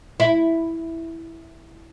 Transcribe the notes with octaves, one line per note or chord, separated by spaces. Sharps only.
E4